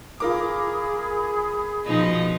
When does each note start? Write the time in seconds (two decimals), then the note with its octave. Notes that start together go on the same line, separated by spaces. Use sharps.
0.20 F4 G#4 A#4 B5 D6 D#6
1.86 B2 F3 D#4